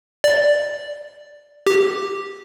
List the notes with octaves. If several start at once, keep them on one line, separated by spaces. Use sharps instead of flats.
D5
G4